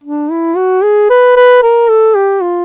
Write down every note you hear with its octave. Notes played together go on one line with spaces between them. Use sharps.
D4
E4
F#4
G#4
B4
B4
A#4
A4
G4
F4